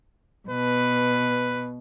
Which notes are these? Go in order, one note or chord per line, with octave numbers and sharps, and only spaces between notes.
B2 B4